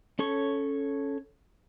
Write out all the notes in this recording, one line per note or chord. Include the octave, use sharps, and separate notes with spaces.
C#4 A4 C#5 C#6